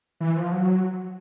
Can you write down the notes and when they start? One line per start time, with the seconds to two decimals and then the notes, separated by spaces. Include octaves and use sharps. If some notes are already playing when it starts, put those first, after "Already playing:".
0.20 E3
0.37 F3
0.52 F#3